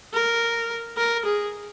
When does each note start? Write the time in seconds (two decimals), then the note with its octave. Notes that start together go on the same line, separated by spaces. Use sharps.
0.13 A#4
0.97 A#4
1.25 G#4